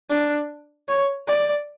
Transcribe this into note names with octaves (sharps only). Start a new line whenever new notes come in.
D4
C#5
D5